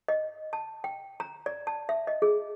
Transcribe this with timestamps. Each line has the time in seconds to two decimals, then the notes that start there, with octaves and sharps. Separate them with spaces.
0.08 D#5
0.53 A5
0.84 G5
1.20 A#5
1.46 D5
1.67 A5
1.89 E5
2.07 D#5
2.22 G#4